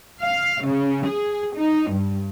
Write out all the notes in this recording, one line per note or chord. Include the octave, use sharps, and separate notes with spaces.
F5
C#3
G#4
D#4
G2